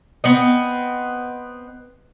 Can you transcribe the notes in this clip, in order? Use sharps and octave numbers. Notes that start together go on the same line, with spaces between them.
B3 C4 D#5